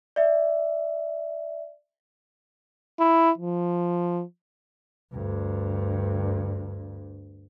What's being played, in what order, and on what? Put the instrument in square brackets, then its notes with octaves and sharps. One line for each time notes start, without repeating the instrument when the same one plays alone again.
[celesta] D5 E5
[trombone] E4
F3
[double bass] D2 G2